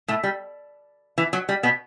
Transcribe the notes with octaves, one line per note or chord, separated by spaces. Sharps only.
A2 A3
G3
E3
F#3
G3
B2 B3